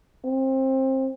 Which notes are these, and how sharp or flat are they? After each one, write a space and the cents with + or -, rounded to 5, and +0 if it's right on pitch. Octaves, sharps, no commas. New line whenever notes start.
C4 +25